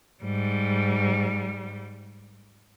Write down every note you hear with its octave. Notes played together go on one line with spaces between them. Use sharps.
G#2 G3